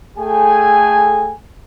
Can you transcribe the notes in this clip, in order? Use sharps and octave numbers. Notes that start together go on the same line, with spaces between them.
A3 G#4 A4 G5 G#5